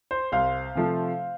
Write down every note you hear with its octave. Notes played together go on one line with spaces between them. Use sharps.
C5
C2 C5 F5
C3 F3 A3